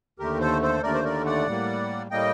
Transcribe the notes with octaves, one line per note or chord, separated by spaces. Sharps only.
D#2 D3 A3 G4 A#4
A4 C5
A4 C5
D#2 D3 A3 A#4 D5
C5
A#4 D5
D5 F#5
A2 G3 A#3
A2 G3 A#3 D#5 G5